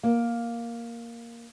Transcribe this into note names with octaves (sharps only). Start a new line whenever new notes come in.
A#3